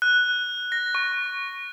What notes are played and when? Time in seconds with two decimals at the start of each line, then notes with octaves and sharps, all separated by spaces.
0.02 F#6
0.72 A#6
0.95 C#6